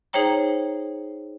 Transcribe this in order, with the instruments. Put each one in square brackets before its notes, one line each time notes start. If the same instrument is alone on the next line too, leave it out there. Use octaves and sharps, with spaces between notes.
[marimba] D#4 G#4 C5 C#5 G5 A#5